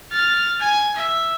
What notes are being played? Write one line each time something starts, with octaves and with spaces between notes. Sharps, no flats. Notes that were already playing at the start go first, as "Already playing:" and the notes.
F6 A6
G#5
E5